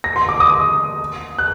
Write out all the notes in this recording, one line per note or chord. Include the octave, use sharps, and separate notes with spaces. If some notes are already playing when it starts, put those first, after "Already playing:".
A#6
C6
D6
D#6
F#6